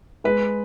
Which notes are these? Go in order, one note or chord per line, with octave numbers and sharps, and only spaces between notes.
G#3 B4